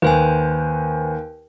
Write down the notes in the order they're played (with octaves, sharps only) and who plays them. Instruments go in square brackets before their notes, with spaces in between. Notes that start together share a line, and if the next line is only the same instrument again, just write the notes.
[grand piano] D#2 [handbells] B4 C5 G#5